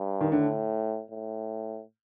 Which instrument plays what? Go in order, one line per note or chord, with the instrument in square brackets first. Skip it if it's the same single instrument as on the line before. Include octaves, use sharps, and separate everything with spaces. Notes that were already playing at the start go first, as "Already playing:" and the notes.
Already playing: [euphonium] G2
[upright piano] D#3
[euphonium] A2 [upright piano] D3
[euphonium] A2